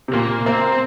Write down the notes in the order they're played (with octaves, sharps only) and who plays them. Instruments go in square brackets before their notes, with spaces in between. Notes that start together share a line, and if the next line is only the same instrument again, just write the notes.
[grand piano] C3
[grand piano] A#2 [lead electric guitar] A#3
[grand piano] A#3 [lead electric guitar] C4